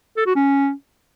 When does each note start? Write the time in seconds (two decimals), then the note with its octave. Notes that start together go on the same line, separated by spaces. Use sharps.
0.17 A4
0.26 F#4
0.36 C#4